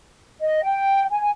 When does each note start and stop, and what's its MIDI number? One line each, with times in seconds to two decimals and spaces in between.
0.41 0.63 75
0.64 1.03 79
1.10 1.29 80